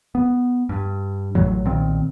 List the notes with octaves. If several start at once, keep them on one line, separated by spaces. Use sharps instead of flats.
B3
G2
A1 A2 C3 F#3
B1 A#2 D#3 C4